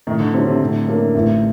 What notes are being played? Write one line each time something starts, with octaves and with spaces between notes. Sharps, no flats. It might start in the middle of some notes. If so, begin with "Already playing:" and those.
A2 D#3
D3
C3 F#3 C4
C3
A2 C3
F#3 A#3 D4
A1